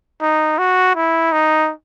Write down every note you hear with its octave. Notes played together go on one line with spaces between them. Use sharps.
D#4
F#4
E4
D#4